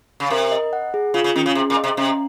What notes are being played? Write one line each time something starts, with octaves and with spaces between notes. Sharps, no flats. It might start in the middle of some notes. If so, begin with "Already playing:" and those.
C#3
C3 A#4
D#5
F#5
G#4
C#3 F4
C#3
D#3 C#4
C#3
C3 G#4
A#2
D#5
C3
C3 C#4